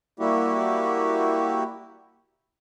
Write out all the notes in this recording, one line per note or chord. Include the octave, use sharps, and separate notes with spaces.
G3 A#3 E4 F#4 G4